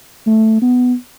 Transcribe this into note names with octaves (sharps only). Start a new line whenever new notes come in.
A3
B3